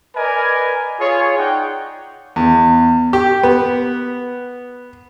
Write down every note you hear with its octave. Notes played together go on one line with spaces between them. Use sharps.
A#4 B4 D5 D#5 G#5
F4 G#4 C#5
D#4 G#4 D5 F#5 G5
E2
G4
B3